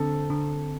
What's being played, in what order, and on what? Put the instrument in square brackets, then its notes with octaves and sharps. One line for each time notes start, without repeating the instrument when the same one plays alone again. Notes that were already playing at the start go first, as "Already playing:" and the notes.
Already playing: [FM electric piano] D3 C4 [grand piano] A4
[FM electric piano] D3